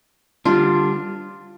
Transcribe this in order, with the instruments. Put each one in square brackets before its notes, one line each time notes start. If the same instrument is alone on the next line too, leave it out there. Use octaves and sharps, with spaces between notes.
[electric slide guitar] D3 G3 D4 [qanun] F4